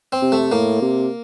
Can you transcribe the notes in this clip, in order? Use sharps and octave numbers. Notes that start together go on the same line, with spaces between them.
C4
C3
A3
A2 A#3
C3